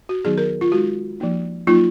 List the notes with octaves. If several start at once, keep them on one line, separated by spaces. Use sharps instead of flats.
F#4
D#3 F#3 B3 D#4 G#4
A#4
F4
G#3 D#4 F#4
F3 A#3 D#4
F#3 A#3 D#4 F4